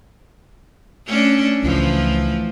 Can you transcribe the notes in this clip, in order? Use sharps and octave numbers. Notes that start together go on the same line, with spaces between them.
A3 C#4 D4
C#2 A2 E3 F3